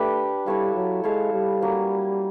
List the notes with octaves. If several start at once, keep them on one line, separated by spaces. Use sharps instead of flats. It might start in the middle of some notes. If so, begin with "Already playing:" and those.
Already playing: A3 D4 G4 B4
G3 E4 A4 C#5 F5
F#3
G#3 E4 A4 C#5 F5
G3
F#3 A#3 C#4